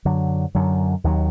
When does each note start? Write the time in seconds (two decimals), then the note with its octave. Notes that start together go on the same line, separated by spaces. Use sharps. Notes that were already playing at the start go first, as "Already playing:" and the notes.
0.05 F#2 D3 F#3
0.55 F#2 D3 F#3
1.04 D#2 D#3 F#3